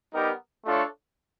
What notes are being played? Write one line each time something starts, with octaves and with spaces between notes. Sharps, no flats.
G3 B3 D#4 G4 A#4
A3 D4 F4 A4 C#5